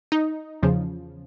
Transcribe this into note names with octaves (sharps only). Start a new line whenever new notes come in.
D#4
E2 C#3 F3